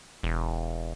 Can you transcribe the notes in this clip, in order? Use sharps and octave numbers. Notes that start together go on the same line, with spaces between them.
E1